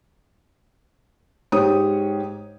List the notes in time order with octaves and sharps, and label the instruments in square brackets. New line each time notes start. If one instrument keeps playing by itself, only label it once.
[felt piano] G#2 G4 C#5 D#6